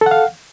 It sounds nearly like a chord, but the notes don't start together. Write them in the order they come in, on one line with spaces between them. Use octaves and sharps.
A4 F#5 F5